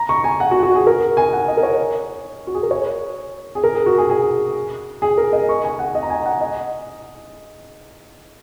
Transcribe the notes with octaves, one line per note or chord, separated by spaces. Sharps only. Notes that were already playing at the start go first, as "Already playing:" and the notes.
Already playing: A#5
C#6
G#5
F#5
F#4
F#4
G#4
A#4
G#5
F#5
D#5
A#4
C#5
F#4
G#4
A#4
C#5
G#4
A#4
G#4
F#4
G#4
G#4
G#4
A#4
D#5
C#6
G#5
F#5
D#5
A#5
G#5
F#5
D#5